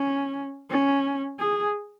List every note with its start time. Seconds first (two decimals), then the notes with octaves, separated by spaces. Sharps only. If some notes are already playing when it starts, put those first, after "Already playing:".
Already playing: C#4
0.70 C#4
1.39 G#4